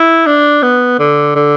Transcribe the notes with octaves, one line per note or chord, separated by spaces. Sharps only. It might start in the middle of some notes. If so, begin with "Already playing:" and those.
Already playing: E4
D4
B3
D3
D3